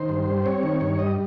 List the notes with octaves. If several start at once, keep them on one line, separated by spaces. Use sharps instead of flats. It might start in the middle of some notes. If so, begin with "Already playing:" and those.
Already playing: D#3 C5
G2
G3
C4 C#5
D#3
G2
G3 D#5